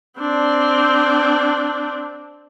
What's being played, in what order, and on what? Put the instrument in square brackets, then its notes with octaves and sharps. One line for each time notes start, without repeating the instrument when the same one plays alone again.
[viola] C4 D4